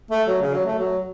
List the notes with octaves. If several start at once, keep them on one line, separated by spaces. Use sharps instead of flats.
A3
F#3
C#3
F#3
A3
F#3